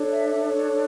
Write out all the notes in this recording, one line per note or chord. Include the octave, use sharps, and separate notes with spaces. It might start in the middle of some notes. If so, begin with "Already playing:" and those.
Already playing: D4 A4 C#5
E5
E5
C#5